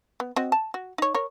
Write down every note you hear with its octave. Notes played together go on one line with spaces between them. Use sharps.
B3
C4 F#4 D#5
A5
F#4
D#4 C#5
A#4 C#5